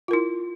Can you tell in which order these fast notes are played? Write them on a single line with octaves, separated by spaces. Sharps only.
F4 A#4 E4